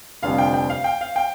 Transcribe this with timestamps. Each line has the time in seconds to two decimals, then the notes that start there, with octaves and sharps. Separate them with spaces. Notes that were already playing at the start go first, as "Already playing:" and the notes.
0.23 F1 F2 D3 G3 D4 F5
0.38 G5
0.54 G5
0.70 F5
0.84 G5
1.01 F5
1.16 G5